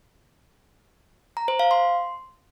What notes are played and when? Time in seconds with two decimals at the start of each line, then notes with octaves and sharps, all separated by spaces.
1.37 A#5
1.48 C5
1.59 F5
1.71 C6